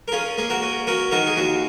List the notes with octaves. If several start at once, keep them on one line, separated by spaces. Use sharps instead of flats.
A#4
C#4 F4 G#4
A#3 G#4
F#4 A#4
C#4
C#4 F#4 A#4
D#3 F#4 A#4
G#4
D#2 F#4